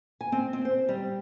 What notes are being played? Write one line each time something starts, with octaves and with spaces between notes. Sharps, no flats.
G#5
C4
C4
C5
G3